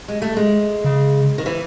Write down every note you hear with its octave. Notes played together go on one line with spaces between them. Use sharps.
G#3
A3
G#3
C#3
D#3
E3